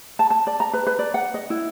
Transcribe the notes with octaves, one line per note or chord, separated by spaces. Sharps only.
A5
A5
D5
A#5
B4
B4
D5
F#5
D#5
E4